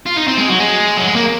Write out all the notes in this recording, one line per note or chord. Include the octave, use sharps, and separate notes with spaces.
F4
D#4
C4
G#3
F#3
G#3
F#3
G#3
A#3